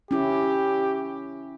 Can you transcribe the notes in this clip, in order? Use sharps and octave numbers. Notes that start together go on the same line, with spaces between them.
C#4 E4 G4